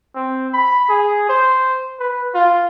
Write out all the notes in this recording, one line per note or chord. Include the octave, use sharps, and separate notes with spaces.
C4
B5
G#4
C5
B4
F4